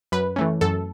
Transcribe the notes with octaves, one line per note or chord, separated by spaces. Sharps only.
F#2 B4
E3 A3 C#4
F#2 A4